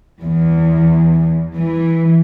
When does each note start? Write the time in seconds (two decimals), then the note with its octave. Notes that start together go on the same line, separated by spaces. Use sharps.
0.22 E2
1.57 E3